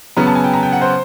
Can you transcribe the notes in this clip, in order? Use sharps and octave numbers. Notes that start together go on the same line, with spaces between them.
C#3 F#3 B3 A#5
A5
G#5
G5
A#5
G5
F#5
C5